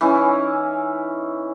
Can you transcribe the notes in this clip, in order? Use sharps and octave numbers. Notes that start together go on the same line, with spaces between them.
E3 C#4 D#4 E4